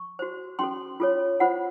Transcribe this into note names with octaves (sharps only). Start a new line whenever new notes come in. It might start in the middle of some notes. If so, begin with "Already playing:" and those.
Already playing: C#6
F#4 C5
C#4 F#4 A4 C6
F4 A4 C#5
F4 C5 F#5